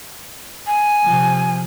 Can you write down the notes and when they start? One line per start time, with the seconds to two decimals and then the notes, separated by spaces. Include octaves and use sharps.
0.67 G#5
1.05 C3 F3